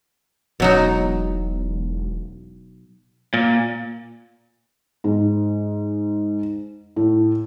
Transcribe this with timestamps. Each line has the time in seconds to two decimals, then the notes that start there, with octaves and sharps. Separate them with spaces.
0.60 E1 B2 F#3 D#4
3.34 A#2
5.04 G#2
6.96 A2